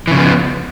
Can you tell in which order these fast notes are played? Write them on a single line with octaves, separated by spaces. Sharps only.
E3 C#3 F3 B3